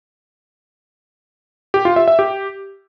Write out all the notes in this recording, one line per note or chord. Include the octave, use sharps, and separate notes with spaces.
G4
F4
E5
E5
G4